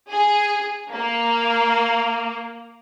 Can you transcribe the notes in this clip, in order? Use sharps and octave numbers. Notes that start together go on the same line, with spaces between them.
G#4
A#3